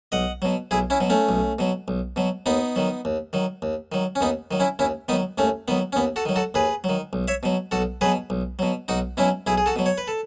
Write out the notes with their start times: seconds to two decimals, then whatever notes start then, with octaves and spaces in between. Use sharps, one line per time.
0.12 B1 D#5 F#5
0.42 B2 F#3
0.71 B1 E4 G#4
0.90 C#4 E4
1.00 B2 F#3
1.10 A3 C#4
1.29 B1
1.59 B2 F#3
1.88 B1
2.16 B2 F#3
2.46 D#2 B3 D#4
2.76 D#3 F#3
3.05 D#2
3.33 D#3 F#3
3.62 D#2
3.92 D#3 F#3
4.15 C#4
4.21 D#2 B3 D#4
4.51 D#3 F#3
4.60 C#4 E4
4.79 D#2 C#4 E4
5.08 D#3 B3 D#4
5.12 F#3
5.38 D#2 A3 C#4
5.68 D#3 F#3 B3
5.93 C#4
5.96 D#2 B3
6.16 F#4 A4
6.25 D#3 F#3
6.36 F#4 A4
6.54 D#2 G#4 B4
6.84 D#3 F#3
7.13 B1
7.28 C#5 E5
7.43 B2 F#3
7.71 B1 F#4 A4
8.01 F#3 G#4 B4
8.05 B2
8.30 B1
8.59 B2 F#3
8.88 B1 D#4 F#4
9.17 B2 F#3 C#4 E4
9.47 B1 E4 G#4
9.58 G#4
9.66 F#4 A4
9.76 B2 F#3
9.86 C#5
9.98 B4
10.08 A4